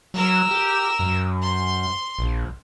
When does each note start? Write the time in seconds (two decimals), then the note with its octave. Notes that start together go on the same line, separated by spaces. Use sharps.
0.14 F#3 A#4 E6
0.51 G4
0.99 F#2
1.42 C6
2.19 A#1